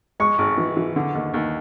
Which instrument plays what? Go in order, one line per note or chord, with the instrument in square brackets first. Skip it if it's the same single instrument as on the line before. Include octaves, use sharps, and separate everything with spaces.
[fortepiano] G#3 [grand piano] C#6
[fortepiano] G#1
E3
E3
D3
D#2
D#2